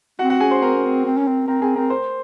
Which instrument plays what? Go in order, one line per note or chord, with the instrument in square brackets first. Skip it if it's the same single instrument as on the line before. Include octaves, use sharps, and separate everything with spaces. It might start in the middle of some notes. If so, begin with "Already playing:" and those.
[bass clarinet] C4 [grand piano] F#4 F#5
[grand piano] F#4 F#5
[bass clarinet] C#4 [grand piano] G#4 G#5
[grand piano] C5 C6
[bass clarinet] C4 [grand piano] A#4 A#5
[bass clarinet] C#4
C4
C4
C#4
C4
[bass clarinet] C4 [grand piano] A#4 A#5
[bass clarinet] C4 [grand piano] G#4 G#5
[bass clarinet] C4 [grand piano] A#4 A#5
[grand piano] C5 C6